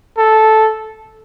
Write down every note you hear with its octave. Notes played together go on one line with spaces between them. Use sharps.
A4